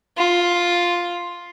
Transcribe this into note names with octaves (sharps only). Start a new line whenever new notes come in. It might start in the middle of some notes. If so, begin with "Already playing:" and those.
F4